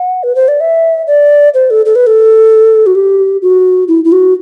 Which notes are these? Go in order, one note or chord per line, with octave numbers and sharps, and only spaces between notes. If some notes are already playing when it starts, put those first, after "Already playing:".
Already playing: F#5
B4
C5
D5
E5
D5
C5
A4
A4
B4
A4
F#4
G4
F#4
E4
E4
F#4